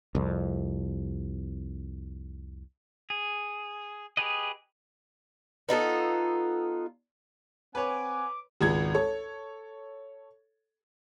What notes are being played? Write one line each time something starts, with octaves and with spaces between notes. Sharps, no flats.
C2 F2
G#4
G4 G#4 B4 D#5
B3 D#4 F4 A4
C4 B4 C#5 F#5 G#5 D6
G#1 C#2 G#6
A4 C#5